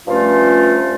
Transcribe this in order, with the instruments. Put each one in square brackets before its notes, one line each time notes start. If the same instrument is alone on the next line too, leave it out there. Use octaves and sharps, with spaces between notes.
[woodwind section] G2 F3 A3 C#4 F4